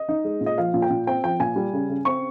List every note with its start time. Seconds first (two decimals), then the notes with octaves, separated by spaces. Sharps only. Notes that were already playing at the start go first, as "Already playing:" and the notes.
Already playing: D#5
0.09 D#4
0.24 G#3
0.41 A#2
0.46 D#5
0.58 F3 F5
0.74 A#2
0.82 G5
0.90 A#2
1.07 C4 G5
1.24 F3 G5
1.40 A#2 G#5
1.56 G3
1.73 C#3
1.89 C#3
2.05 C4 C#6